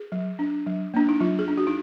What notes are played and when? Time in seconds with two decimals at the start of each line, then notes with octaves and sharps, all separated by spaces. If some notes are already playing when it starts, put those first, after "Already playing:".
Already playing: G#4
0.12 F#3
0.39 D4
0.67 F#3
0.94 A#3 D4
1.09 D#4
1.20 F#3 F4
1.39 G#4
1.48 D4
1.57 F#4
1.67 D#4